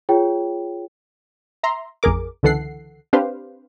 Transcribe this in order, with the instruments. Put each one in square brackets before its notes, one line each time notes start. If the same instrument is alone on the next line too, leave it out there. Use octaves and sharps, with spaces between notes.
[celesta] F4 G#4 C#5 G5
[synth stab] E5 A#5 C6
A1 F2 G#4 A#4 D6
C#2 D3 E3 A4 F#5 C7
C4 D4 G4 B4 C5 F5